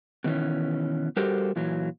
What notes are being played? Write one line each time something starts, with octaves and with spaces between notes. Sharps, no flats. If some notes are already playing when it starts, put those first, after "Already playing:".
B2 D#3 E3 C#4
G3 F#4 G4 A4 A#4 C5
A#2 E3 F#3